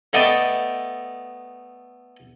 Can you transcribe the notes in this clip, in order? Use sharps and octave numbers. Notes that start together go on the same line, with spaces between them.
A3 B3 D5 D#5 G5 A5